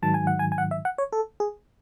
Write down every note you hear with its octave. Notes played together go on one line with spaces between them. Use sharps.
G#2 D#3 F#3 A5
G#5
F#5
G#5
G#5
F#5
E5
F#5
C#5
A4
G#4